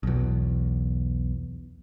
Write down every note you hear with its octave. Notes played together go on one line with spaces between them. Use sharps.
B1 E2